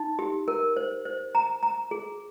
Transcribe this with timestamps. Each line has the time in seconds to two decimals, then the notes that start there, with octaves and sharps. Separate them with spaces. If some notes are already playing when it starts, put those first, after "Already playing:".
Already playing: D#4
0.19 G4
0.48 A#4
0.77 C5
1.05 C5
1.35 A#5
1.63 A#5
1.91 G#4